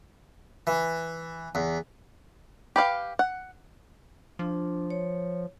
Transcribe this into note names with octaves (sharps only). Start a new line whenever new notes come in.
E3
E2
G4 B4 F5 G5
F#5
F3 D4
C#5